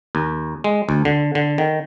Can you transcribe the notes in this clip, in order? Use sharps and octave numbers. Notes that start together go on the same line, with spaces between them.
D#2
G#3
D2
D3
D3
D#3